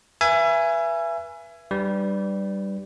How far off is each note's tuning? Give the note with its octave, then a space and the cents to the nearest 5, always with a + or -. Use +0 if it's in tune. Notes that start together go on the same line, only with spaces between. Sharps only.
B4 -30 E5 +30 G#5 +0
G3 -5 D4 +30 B4 +15